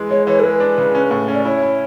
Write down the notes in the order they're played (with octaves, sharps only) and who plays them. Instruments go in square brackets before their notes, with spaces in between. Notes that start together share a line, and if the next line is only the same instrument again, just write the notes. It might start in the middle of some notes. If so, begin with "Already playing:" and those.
Already playing: [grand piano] E3 G#3
[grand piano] G#3 [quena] C#5
[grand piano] E3 [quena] C#5
[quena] A4
[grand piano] G#3 [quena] B4
[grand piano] D4
C#3
C#4
A2
C#4
[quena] D5
[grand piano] E4 [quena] C#5
[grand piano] E4